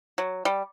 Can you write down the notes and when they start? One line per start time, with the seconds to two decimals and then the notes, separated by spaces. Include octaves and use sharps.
0.18 F#3
0.45 G3